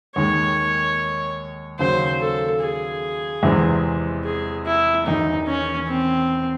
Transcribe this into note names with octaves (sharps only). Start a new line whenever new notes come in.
D#2 D#3 G#3 C#5
D#2 C#3 F#3 C5
A4
G#4
E2 C3 E3 G#3 C4
G#4
E4
E1 E2 D#3 D#4
C#4
C4